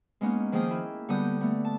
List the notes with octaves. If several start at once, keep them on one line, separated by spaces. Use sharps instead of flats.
G#3 A#3 B3 C#4 D#4
D#3 F3 A#3 G#4 G5 D#6
E4
D3 G3 B3 D#6 G6
A3 B3
A5